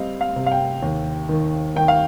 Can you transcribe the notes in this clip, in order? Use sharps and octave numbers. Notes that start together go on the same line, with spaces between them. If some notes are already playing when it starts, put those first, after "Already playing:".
Already playing: G3 C4 D#5 F5
F5
C3
F5
G5
D#2
D#3
D#3 G5
F5